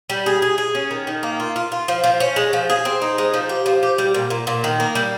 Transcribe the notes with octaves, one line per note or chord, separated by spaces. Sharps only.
G3
G#4
G#4
G#4
C#4
D#3
D#3
A#3
F4
F4
F4
F3
F3
C#4
G#3
F3
G#4
C4
D#4
G#3
F3
G4
F3
G4
G3
A#2
A#2
A#2
D#3
A#3
G3